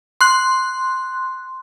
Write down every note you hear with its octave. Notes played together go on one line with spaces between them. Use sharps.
C6 F#6